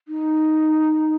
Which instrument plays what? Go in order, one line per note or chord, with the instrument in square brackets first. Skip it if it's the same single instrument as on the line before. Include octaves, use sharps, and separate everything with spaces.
[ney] D#4